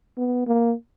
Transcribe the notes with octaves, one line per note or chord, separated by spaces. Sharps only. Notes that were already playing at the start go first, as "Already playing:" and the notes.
B3
A#3